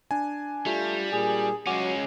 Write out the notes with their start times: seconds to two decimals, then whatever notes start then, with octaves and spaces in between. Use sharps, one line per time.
0.11 D4 G#5
0.66 G3 A3 F4
1.13 A#2 G#4
1.67 F#3 G#3 C#4 F#4 D6